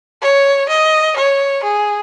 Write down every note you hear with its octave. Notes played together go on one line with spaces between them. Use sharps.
C#5
D#5
C#5
G#4